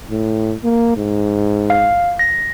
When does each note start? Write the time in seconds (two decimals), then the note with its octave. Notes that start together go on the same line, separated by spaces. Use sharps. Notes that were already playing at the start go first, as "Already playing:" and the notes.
0.11 A2
0.64 A#3
0.97 G#2
1.70 F5
2.19 A#6